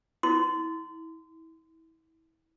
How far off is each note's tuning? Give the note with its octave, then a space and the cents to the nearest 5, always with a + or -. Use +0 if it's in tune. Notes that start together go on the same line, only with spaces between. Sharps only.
E4 -30 C6 -30